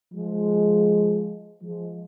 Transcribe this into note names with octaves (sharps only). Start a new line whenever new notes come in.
F3 G#3
F3 G#3